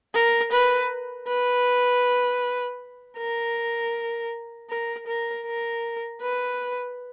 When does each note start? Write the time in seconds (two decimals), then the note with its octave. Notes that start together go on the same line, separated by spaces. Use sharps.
0.15 A#4
0.52 B4
1.28 B4
3.17 A#4
4.70 A#4
5.07 A#4
5.46 A#4
6.22 B4